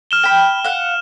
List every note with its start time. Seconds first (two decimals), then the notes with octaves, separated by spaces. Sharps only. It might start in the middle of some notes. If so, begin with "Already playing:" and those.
0.11 F6 E7 G7
0.23 G5 B5
0.64 F5 F#5